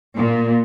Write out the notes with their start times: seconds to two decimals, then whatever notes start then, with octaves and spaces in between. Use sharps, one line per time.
0.17 A#2